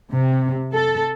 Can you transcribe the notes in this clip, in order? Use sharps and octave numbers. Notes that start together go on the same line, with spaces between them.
C3
A4